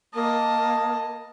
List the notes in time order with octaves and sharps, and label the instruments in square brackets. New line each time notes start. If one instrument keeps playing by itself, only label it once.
[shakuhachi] A#3 [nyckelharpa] D#5 A5